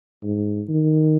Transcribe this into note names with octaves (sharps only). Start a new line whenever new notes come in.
G#2
D#3